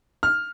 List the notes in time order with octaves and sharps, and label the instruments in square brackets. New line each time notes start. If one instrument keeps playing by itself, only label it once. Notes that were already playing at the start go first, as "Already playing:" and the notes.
[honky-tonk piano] F6